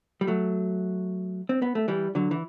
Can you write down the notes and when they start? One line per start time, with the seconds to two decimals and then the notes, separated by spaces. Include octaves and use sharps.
0.21 G3
0.27 F#3 A3
1.49 C4
1.62 B3
1.75 A3
1.88 E3 G3
2.15 D3 F#3
2.31 E3